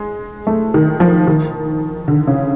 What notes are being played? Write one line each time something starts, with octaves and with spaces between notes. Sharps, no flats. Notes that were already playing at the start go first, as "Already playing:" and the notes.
Already playing: G#3
A3
D#3
F3
D#3
D3
C#3